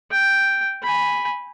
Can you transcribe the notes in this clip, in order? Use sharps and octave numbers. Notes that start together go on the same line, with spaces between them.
G5
G#5 B5